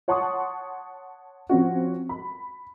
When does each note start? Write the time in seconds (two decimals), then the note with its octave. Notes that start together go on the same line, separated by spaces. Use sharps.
0.08 C#5 F#5 A5 C6 C#6 D#6
1.49 F3 C4 C#4 F#4
2.09 B5